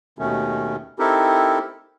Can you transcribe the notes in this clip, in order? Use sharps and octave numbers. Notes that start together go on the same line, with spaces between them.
D#2 B2 D#3 A3 C#4
C4 D#4 E4 G4 A4 A#4